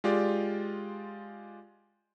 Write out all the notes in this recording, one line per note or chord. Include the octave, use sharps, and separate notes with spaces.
G#3 F4 G4 D5